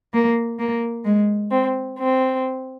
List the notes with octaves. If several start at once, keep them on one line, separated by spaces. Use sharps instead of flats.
A#3
A#3
G#3
C4
C4